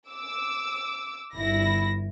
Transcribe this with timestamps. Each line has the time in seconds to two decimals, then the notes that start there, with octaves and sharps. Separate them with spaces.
0.10 D6 E6
1.36 G1 E4 A#6